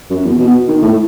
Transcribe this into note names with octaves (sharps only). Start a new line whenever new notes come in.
F#2
E2
B2
D#3
A2